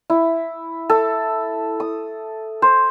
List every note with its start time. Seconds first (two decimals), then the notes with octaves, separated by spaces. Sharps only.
0.10 E4
0.90 A4
1.80 D#6
2.62 C5